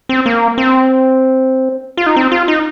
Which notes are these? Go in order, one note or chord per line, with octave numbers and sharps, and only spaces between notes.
C4
A#3
C4
F4
D#4
C4
F4
D#4